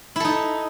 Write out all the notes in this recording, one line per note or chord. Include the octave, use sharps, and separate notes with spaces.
D#4 E4 A4